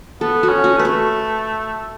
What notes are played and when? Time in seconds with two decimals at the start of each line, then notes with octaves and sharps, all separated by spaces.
0.21 B3 A4
0.43 F#4
0.49 C#4
0.64 F#4
0.78 A3 B4
0.85 A4